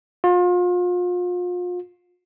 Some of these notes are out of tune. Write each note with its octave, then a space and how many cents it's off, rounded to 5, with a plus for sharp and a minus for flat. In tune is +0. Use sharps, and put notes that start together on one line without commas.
F4 +35